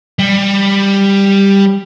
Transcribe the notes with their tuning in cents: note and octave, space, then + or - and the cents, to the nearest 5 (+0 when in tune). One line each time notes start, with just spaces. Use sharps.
G3 +10